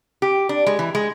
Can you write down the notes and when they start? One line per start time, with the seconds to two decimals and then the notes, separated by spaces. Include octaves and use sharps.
0.22 G4
0.49 D4
0.66 G#3
0.79 E3
0.95 G#3